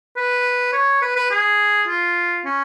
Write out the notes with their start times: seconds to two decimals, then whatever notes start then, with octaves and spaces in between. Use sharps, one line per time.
0.16 B4
0.73 C#5
1.02 B4
1.16 B4
1.30 G#4
1.87 F4
2.45 C#4